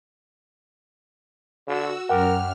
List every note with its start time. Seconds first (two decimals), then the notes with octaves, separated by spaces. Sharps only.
1.67 D3 F#4 E6
2.09 F#2 A#4 F#5 G5 D6 F6